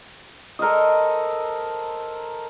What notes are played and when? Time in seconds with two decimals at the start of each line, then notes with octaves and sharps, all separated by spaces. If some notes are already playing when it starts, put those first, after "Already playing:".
0.59 A4 A#4 C5 D#5